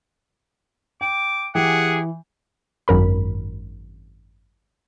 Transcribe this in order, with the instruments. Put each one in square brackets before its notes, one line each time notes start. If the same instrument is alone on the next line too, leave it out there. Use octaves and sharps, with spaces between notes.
[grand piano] G5 [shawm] D6
[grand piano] E3 [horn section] G4 G#4 [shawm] F#5
[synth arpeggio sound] G#1 F#2 A#4 B5